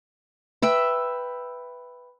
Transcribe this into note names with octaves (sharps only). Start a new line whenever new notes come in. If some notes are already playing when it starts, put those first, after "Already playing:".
B4 E5 G5